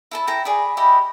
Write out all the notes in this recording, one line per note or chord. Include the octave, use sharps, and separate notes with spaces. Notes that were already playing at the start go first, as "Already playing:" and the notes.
E4 A4 A5
E4 A4 G5 A#5
G#4 D5 B5
E4 G4 D#5 B5